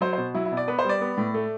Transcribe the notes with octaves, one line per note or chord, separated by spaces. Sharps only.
F#3 C5
B2 C5
F#3 E4
E4
B2
D5
B3 B4
C5
G3 D5
B3
A2
A3